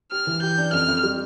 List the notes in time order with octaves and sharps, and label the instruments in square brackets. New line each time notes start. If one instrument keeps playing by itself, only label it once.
[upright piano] G4 [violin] F6
[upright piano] E3
[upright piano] G4 [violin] G6
[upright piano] D4
[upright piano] F2 [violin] F6
[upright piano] F2
G3